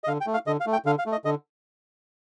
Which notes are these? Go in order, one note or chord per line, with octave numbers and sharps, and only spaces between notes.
D#5
D3 F5
G5
A3
F5
D3 D#5
F5
A3
G5
D3 F5
F5
A3
D#5
D3 D#5